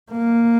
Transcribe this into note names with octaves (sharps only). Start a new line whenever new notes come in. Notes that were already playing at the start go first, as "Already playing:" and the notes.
A#3